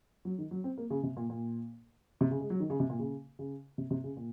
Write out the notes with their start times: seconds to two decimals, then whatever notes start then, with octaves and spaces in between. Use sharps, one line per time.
0.25 F#3
0.38 D#3
0.51 F#3
0.64 C4
0.78 A#3
0.90 C#3
1.03 C3
1.17 A#2
1.30 A#2
2.21 C3
2.31 C#3
2.40 G#3
2.50 F#3
2.60 D#3
2.70 C#3
2.80 C3
2.90 A#2
2.99 C#3
3.39 C#3
3.78 C3
3.91 C3
4.04 C#3
4.17 A#2